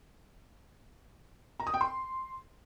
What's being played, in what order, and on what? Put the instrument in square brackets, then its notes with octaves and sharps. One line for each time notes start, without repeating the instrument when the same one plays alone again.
[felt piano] A#5
D#6
G5
C6